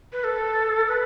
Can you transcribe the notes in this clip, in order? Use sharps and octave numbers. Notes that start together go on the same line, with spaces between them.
B4
A4
B4